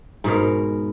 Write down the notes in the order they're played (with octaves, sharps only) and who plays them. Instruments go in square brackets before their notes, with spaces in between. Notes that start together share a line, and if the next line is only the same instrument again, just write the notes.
[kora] G#2 B2 A#4